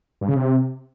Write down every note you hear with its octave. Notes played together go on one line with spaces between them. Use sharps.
G2
C#3
C3